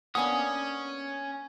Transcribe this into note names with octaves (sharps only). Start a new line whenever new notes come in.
A#3 B3 C#4 D4 F#5 G#5 D#6